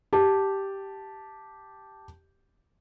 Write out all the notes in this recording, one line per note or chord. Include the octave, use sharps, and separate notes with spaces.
G4 A5